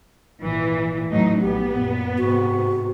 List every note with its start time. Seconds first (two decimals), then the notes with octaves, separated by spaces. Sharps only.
0.42 G#1 A#2 E3
1.11 E2 A2 F#3 D#4
1.41 A#1 F#3 B3 G4
1.72 F#2 A#2
2.18 G#2 C3 F#4